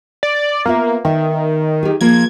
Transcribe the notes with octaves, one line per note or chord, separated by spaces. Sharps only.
D5
A#3 B3 F4 E5
D#3 E5
G4 G#4
F3 A#3 F4 G#6